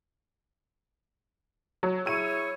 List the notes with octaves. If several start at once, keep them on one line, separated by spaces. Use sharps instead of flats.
F#3
E4 G#4 C#5 E6 D#7